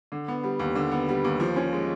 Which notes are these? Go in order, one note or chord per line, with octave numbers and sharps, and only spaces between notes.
D3
B3
G3
D#2
D3
B3
G3
D#2
F3
C#4
G#3